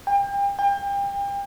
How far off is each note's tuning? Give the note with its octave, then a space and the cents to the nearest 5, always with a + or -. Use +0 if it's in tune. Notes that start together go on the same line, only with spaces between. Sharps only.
G5 +35
G5 +35